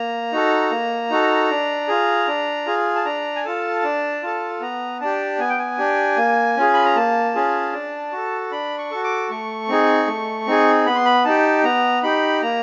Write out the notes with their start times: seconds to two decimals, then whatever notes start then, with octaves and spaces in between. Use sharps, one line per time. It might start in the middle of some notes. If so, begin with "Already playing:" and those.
Already playing: A#3 A#5
0.32 D#4 F#4 A4
0.71 A#3
1.10 D#4 F#4 A4
1.50 D4
1.88 F4 G#4
2.27 D4
2.66 F4 G#4
2.95 A5
3.05 D4 A#5
3.36 G#5
3.45 F4 A4 A5
3.84 D4
4.23 F4 A4
4.61 B3 A#5
5.01 D4 G4 A5
5.39 B3 G#5
5.49 G5
5.58 G#5
5.78 D4 G4
6.17 A#3
6.57 C#4 F4 G#4
6.74 B5
6.85 A#5
6.96 A#3 A5
7.35 C#4 F4 G#4
7.73 D4
8.12 F#4 A4
8.51 D4 B5
8.78 C#6
8.91 F#4 A4
9.04 D6
9.30 A3 C#6
9.68 C4 D#4 G#4
10.07 A3
10.47 C4 D#4 G#4
10.86 B3 B5
10.96 C6
11.06 B5
11.25 D#4 G4 A5
11.64 B3 A#5
12.03 D#4 G4 B5
12.42 A#3 A#5